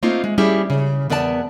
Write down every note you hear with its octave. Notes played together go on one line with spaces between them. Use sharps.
A3 A#3 C4 D#4 F4
G#3
G3 C#4 E4 G4 G#4 E5
C#3
E2 B3 A#4 D5 D#5 A5